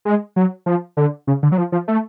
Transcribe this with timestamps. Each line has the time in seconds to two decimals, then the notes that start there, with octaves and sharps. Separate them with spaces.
0.05 G#3
0.36 F#3
0.66 F3
0.97 D3
1.27 C#3
1.43 D3
1.52 F#3
1.58 F3
1.72 F3
1.88 A3